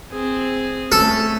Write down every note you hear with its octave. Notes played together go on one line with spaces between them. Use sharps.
C4 G#4
A3 C#4 A4